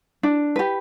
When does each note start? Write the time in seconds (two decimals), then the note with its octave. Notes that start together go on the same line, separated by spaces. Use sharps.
0.23 D4
0.56 G4 B4